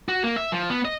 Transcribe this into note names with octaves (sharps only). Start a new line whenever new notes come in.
F#4
A#3
E5
F3
B3
D#5